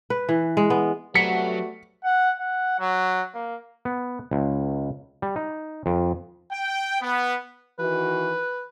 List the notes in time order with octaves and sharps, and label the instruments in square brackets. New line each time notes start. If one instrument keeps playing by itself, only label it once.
[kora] B4
E3
G#3
B3
[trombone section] C3 G3 B3 [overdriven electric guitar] F#3 [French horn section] A3 F#4 [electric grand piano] B6 C#7
[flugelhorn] F#5
F#5
F#3
A#3
[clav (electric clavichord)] B3
C#2
G3
D#4
F2
[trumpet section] G5
B3
[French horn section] D#3 E3 F#4 [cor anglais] B4